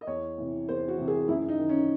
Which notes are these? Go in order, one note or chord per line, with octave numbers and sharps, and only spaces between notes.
D#5
E2 C#5
C3 E3
E2 C5
F#4
C3 E3
G#4
F#2 E4
D#4
D#3
C#4